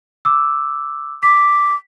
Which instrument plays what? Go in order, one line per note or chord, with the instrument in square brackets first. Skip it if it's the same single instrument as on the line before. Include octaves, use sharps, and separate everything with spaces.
[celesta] D6 E6
[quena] D6 [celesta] B6